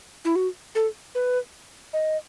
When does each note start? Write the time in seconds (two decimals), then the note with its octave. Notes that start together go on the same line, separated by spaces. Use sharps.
0.25 E4
0.36 F#4
0.75 A4
1.15 B4
1.93 D#5